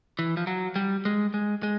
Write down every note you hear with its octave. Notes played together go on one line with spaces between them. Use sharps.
E3
F3
F#3
G3
G#3
G#3
G#3